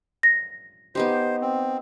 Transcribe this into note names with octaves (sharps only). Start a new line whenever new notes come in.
A#6
B3 D#4 G4 C5
C4